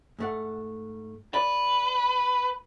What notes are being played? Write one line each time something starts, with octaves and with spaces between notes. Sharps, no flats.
G#2 A3 F#5
B4 D5